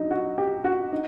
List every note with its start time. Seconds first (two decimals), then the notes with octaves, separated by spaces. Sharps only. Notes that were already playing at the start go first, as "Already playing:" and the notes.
Already playing: F#3 D4 D#4
0.11 F#4
0.38 G4
0.64 F#4
0.92 D#4